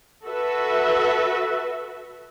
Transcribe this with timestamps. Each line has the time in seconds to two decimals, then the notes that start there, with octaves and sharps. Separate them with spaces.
0.25 F#4 A4 B4 E5